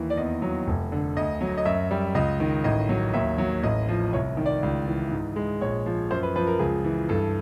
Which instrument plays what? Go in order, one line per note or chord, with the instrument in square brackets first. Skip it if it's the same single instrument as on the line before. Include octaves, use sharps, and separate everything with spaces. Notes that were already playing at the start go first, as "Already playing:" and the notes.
Already playing: [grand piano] D#2 E3
D5
E2 D#5
F#3
F1
D3
D2 D#5
F#3
D#5
F#2 E5
G3
C#2 D#5
D#3
A1 D#5
F#3
D#2 E5
F#3
A1 D#5
F3
C2 C#5
D#3
D5
C#2
E3
G#2
G#3
A#1 C#5
F3
F#2 C5
B4
F3 B4
A#4
C#2 G#4
E3
G2 A4